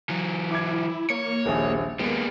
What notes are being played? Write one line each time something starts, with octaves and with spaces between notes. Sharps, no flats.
E3 F#3
E4 D6 G#6
A#3 C#5
D#1 A#1 G#4
D#2 G3 G#3 A#3 B3